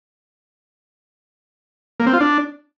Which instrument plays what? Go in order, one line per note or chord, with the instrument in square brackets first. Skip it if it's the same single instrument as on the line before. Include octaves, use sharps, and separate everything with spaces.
[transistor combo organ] A#3
C4
F4
D4